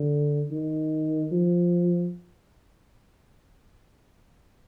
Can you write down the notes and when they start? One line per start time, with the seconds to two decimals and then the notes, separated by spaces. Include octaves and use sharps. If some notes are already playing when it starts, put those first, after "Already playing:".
Already playing: D3
0.51 D#3
1.32 F3